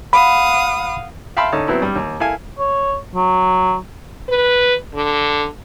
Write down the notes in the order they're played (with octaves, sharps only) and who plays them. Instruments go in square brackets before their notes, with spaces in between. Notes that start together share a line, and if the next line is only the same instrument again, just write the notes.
[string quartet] F5 F#5 D#6 [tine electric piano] B5
[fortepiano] E5 F5 G5 A5 B5 C6
D3 C#4 D#4 A5
F#3 B3 C4 E4
G2 G3
D#2
E4 A4 F5 G#5
[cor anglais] C#5
F#3
[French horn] B4
D3